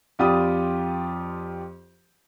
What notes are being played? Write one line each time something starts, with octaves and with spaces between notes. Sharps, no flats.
F2 F4 G4 D5 B5 D#6